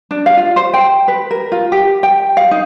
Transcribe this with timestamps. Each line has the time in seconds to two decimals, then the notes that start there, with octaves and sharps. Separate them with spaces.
0.11 D4
0.26 F5
0.37 F4
0.56 C5
0.73 G5
1.08 B4
1.31 A#4
1.52 F4
1.72 G4
2.03 G5
2.37 F5
2.51 D#4